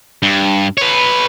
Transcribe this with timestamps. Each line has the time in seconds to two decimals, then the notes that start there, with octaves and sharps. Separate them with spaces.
0.23 G2
0.78 B4 C#5